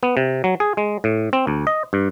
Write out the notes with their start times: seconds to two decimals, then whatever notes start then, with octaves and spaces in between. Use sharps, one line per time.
0.03 B3
0.17 C3
0.44 F#3
0.60 G#4
0.77 G#3
1.04 A2
1.33 C4
1.47 D2
1.67 D#5
1.93 G2